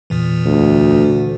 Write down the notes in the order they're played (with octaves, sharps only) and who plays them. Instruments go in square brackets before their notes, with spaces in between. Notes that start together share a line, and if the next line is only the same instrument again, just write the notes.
[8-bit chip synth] E2 A#2 E3
[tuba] D2